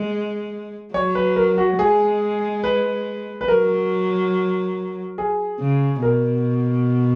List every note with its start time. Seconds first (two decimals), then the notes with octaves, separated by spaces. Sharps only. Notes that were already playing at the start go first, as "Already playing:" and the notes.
Already playing: G#3
0.94 F#3 C#5
1.15 B4
1.36 A#4
1.58 F#4
1.79 G#3 G#4
2.64 B4
3.41 B4
3.48 F#3 A#4
5.18 G#4
5.60 C#3
6.02 B2 A#4